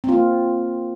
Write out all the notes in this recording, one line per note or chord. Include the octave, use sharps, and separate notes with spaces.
A#3 C4 F4